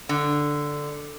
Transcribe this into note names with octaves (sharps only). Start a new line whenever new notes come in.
D3